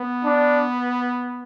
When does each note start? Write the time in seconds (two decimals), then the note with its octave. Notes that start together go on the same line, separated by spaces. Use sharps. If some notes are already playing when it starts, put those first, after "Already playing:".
Already playing: B3
0.25 D4